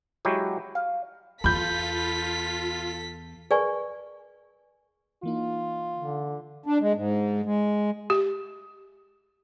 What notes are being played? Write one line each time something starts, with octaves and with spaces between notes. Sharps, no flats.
F#3 G#3 E4 F#4 G4
F5
E2 F4 A4 B5 G6 B6
G#4 A#4 B4 D5 G#5 C#6
E3 A#3 D#4 F4
D3
D4
G#3
G#2
G#3
G4